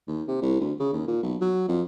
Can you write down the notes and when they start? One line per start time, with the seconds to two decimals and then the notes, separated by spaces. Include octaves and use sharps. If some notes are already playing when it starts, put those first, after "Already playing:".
0.07 D#2
0.28 C3
0.42 C2
0.60 D2
0.80 C#3
0.93 D#2
1.08 A#2
1.23 B1
1.41 F#3
1.68 F2